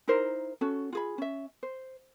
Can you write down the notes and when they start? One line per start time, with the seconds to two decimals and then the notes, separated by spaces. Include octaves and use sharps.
0.08 D#4 E4 A#4 C5
0.61 C#4 F#4 A4
0.93 F4 G#4 B5
1.18 C#4 E5
1.63 C5